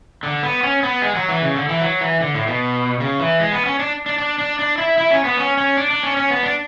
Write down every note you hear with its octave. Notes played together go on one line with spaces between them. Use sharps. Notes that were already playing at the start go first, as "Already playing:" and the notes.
D3
B3
C#4
B3
G#3
F#3
E3
C#3
D3
E3
F#3
E3
D3
A2
B2
C#3
E3
G#3
B3
C#4
D4
D4
D4
D4
D4
E4
E4
C#4
B3
C#4
C#4
D4
D4
C#4
C#4
B3
D4